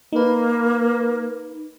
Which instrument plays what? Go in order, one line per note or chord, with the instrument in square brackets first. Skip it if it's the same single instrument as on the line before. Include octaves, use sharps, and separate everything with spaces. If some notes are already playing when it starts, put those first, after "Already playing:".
[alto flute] A#3 [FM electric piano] D#4 B4